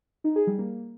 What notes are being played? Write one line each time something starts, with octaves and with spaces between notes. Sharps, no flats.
D#4
G#4
G3
A#3